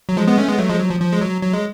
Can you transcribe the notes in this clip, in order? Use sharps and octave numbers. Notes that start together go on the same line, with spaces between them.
F#3
F3 G#3
G#3 B3
A3 C#4
G#3 B3
F#3 A3
F3 G#3
F#3
F3
F3
G#3
F#3
F#3
G#3